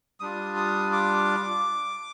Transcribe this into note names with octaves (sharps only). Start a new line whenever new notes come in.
G3 D4 F4 D#6
D#6
D6